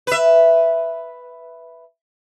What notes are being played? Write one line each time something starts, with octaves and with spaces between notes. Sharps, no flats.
B4 E5